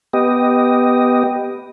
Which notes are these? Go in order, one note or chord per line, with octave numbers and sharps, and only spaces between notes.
B3 G4 D#5